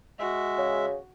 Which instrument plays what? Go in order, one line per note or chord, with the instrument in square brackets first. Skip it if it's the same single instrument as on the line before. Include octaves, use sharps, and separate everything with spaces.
[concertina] G#3 E5 [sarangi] F#4
[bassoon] C#3